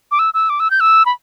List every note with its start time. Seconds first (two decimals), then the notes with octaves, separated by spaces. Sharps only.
0.11 D6
0.19 E6
0.34 E6
0.49 D6
0.60 E6
0.70 G6
0.80 E6
1.06 B5